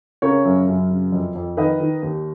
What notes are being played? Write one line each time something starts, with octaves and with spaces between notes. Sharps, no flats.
C#3 A#4 C#5
F#2
F#2
C#3
F2
F2
D#3 B4 D#5
D#3
D#2